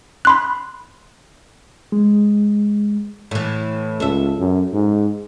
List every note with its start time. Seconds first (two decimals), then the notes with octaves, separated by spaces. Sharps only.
0.25 B5 C6 F#6
1.92 G#3
3.31 A2 E3
4.00 C#2 A4 E5
4.38 F#2
4.73 G#2